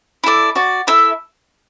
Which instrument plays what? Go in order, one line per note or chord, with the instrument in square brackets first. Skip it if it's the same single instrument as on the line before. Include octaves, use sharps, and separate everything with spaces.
[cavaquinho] E4 A4 D5
F#4 D5
E4 A4 E5